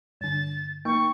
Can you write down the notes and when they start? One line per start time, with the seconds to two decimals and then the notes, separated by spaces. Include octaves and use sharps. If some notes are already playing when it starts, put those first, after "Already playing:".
0.21 G2 D3 A6
0.85 A#3 D#4 G5 C#6